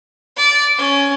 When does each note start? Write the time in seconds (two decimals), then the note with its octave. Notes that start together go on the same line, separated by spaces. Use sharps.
0.37 D5
0.78 C#4